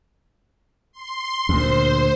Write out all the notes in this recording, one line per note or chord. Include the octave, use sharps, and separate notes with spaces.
C6
D2 A#2 C5